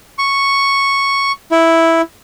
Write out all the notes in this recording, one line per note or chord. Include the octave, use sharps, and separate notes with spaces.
C#6
E4